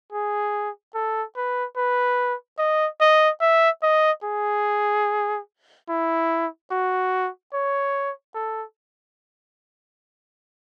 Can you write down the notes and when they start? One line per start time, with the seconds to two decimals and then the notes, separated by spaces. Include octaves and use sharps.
0.12 G#4
0.95 A4
1.36 B4
1.77 B4
2.59 D#5
3.01 D#5
3.41 E5
3.83 D#5
4.24 G#4
5.89 E4
6.71 F#4
7.54 C#5
8.35 A4